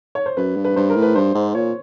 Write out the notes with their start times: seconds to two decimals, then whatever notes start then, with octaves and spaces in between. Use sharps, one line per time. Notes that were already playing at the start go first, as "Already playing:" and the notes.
0.15 C#5
0.26 C5
0.37 F#2 B4
0.57 G2
0.65 B4
0.76 G2 C5
0.90 A#4
0.96 A2
1.02 B4
1.15 G2 C5
1.35 G#2
1.55 A#2 C#5